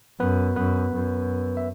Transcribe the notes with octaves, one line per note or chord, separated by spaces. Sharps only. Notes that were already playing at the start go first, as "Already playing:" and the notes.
F#2 B3 B4
F#2 B3 B4
F#2
E5